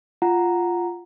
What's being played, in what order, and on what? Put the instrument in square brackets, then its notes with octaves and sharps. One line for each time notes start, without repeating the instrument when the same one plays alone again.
[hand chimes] F4 F#5 A#5